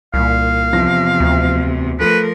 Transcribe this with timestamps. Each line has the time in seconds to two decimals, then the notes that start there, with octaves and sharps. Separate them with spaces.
0.14 C2 A#2 F5
0.73 E2 C3 F3 A#6
1.20 D2
2.00 F3 A3 A#4 B4